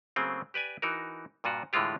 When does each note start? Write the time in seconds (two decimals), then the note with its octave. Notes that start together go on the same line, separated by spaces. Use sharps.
0.16 C#3 F#3 A3 A#3 C4 G#4
0.54 G4 B4 D5 G#5
0.82 E3 D#4 F#4 A#4
1.44 G2 A#2 F4 F#4
1.73 A2 D3 E3 G#3 F4 G4